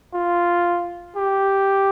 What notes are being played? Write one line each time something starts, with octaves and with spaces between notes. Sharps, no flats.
F4
G4